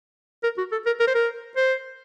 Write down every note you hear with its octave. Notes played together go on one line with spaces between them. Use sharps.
A#4
F#4
A4
A#4
A#4
C5
A#4
C5